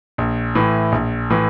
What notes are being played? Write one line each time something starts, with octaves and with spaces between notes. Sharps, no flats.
A#1
A2 E3
A#1
A2 E3